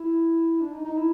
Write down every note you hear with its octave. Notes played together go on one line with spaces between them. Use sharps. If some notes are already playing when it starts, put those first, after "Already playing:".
Already playing: E4
D4
D#4
D#4
E4